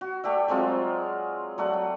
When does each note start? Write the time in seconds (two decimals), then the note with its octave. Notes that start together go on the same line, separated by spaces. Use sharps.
0.01 F#4
0.24 A3 G4 D5 E5
0.48 F#3 G#3 C4 F4
1.58 F#3 A3 D5 F#5
1.73 G5